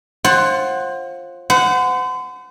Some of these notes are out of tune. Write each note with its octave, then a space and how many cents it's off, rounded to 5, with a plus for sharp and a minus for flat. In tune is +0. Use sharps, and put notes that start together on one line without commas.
F4 +0 C5 +35 F#5 +10
C5 -40 F#5 -5